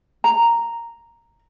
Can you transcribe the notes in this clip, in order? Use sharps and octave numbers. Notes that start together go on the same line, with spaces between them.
A#5